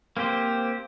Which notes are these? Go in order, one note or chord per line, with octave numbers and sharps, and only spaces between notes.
A#3 C4 G4 C5